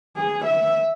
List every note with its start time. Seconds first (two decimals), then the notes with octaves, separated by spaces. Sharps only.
0.16 G#4
0.45 E5